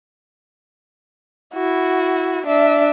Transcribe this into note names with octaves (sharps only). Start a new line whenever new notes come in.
E4 F#4
D4 E5